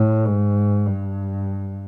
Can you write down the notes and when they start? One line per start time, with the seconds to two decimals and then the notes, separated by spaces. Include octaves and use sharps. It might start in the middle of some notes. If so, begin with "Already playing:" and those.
Already playing: A2
0.25 G#2
0.86 G2